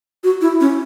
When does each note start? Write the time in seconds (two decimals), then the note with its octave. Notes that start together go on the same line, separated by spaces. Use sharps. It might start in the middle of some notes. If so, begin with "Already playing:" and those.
0.24 F#4
0.41 E4
0.61 C#4